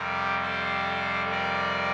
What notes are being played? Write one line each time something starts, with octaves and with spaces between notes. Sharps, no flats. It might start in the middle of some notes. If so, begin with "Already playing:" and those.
Already playing: F2 C3 G3 G4 A#4
A4 C5
A#4 D5